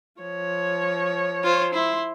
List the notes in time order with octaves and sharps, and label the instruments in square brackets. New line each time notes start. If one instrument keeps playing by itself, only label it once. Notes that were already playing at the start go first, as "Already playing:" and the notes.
[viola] F3 C#5
[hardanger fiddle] F4 C5
[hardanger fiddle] E4 [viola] C6